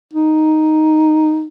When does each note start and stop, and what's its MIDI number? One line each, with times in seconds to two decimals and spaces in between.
0.13 1.47 63